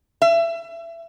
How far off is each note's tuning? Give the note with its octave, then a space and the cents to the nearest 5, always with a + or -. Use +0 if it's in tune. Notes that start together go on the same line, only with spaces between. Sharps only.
E5 +25